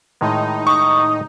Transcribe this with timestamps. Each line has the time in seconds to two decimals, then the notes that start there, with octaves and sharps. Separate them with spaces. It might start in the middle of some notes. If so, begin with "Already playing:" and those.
0.21 A2 D#3 G#3 D#4
0.67 C#6 D#6